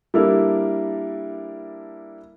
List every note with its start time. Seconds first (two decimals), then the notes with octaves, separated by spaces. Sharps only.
0.14 G3 A#3 D4 E4 A4 A#4